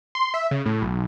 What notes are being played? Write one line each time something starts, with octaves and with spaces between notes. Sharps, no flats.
C6
E5
C#3
A2
B1